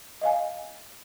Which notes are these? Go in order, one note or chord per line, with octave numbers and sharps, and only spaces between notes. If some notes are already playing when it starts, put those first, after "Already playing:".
D#5 F5 G#5